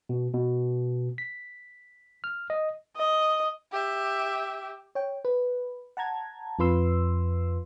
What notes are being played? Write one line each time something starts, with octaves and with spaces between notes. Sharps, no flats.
B2
B2
B6
F6
D#5
D#5
G4 E5
C#5 G5
B4
F#5 A5 A#5 G#6
F2 F4 B4 C6 E6